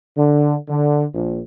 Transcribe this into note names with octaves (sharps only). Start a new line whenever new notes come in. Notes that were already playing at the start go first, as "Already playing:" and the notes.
D3
D3
A#1